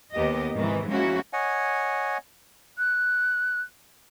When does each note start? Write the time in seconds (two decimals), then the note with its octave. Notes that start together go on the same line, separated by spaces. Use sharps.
0.13 D#2 B3 G4 D#5
0.54 G#2 C3 D#3 E3
0.89 F3 G#3 A#3 C#4 E4 F#4
1.33 C#5 D#5 F#5 G#5
2.78 F#6